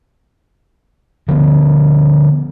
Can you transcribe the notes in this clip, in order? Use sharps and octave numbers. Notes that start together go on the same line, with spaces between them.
D3 F3 A#3 B3